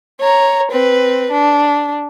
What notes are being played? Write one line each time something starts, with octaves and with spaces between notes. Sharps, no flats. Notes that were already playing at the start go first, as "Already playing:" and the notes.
C#5 A#5
C4 B4
D4